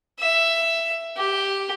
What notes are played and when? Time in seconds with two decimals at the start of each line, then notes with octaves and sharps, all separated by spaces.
0.20 E5
1.17 G4